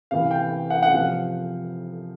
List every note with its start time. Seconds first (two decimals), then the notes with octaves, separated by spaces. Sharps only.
0.11 C3 E3 F5
0.31 G5
0.70 F#5
0.83 F#5
0.90 C3 F3 F5